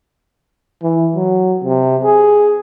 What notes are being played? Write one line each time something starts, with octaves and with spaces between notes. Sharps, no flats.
E3
F#3
C3
G#4